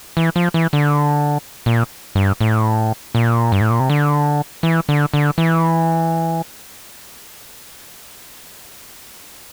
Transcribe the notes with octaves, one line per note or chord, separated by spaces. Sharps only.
E3
F3
E3
D3
A#2
G2
A2
A#2
G2
A2
A#2
C3
D3
E3
D3
D3
E3